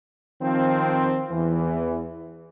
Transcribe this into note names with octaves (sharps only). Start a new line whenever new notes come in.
D#3 F3 C4
E2 E3